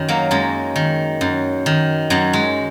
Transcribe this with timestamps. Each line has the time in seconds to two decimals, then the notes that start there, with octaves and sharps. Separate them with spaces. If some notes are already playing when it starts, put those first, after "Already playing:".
Already playing: F#2 D#3 C#4
0.09 F#3 A#3
0.31 F#2 G#3
0.76 D#3
1.21 F#2
1.66 D#3
2.10 F#2 F#3
2.33 G#3